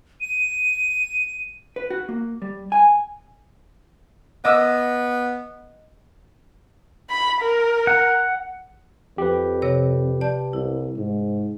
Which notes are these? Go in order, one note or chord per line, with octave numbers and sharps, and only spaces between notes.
D#7
B4
F#4
A#3
G3
G#5
B3 D#5 D6 E6
B5
A#4
F#5
F2 G4 B4
C3 C#5 A#6
D5 A5 G6
C2 E4
G#2